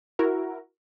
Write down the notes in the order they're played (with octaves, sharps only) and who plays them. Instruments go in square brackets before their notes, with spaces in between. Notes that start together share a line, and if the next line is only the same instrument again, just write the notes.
[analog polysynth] E4 F#4 A#4